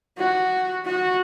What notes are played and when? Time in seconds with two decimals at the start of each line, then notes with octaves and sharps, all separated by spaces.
0.17 F#4
0.85 F#4